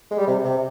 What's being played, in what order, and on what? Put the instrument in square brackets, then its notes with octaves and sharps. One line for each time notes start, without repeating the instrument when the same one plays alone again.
[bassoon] G#3
G3
C3
C3